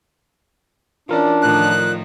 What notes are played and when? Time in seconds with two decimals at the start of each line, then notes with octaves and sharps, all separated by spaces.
1.09 E3 C#4 D4 F4 A#4 D5
1.42 A2 D#3 F3 F#6